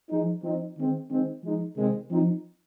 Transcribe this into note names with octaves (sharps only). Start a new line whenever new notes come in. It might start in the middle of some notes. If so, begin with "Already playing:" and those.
F3 G#3 D#4
F3 C4 D#4
D#3 G#3 C4
D#3 G#3 C4
F3 G#3 D#4
C3 D#3 G#3 C4
F3 C4 D#4